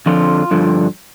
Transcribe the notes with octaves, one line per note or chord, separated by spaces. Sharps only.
F2 D3 F3 F4
G2 D3 F3